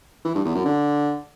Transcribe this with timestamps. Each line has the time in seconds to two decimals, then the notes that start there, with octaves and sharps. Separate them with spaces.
0.25 E3
0.35 G2
0.45 E2
0.55 F#2
0.65 D3